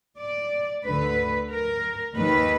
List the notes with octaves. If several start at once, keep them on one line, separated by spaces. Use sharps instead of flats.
D5
D2 D3 B4
A#4
D#2 D#3 B4